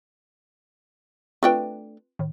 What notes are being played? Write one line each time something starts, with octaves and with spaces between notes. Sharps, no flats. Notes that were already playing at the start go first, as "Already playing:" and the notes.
A3 C4 D4 F4 B4 G5
A2 D#3